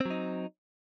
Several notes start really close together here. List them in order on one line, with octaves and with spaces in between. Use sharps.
C4 F#3 D#4